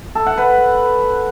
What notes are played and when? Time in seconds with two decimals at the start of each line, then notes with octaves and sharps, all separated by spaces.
0.15 A4
0.26 F#5
0.38 B4